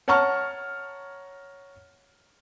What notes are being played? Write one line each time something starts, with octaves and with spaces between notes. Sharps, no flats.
C#5 F#5 A5 A#5 C#6 F6